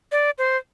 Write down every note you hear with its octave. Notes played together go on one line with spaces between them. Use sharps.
D5
C5